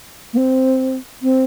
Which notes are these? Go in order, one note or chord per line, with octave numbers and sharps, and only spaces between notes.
A#3
C4
C4